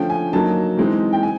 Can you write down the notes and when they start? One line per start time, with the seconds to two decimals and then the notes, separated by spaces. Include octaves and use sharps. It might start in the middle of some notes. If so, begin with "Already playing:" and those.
Already playing: D3 F3 A3 C#4 G5
0.10 G#5
0.32 D3 F#3 A#3 D#4 A5
0.77 E3 G#3 C4 D#4
1.13 G5
1.23 G#5